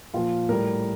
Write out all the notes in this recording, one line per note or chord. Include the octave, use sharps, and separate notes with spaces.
A#2 F3 F4
A2 G3 A#4